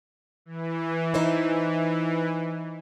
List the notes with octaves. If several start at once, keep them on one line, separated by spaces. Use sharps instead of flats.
E3
D#4 C5 E5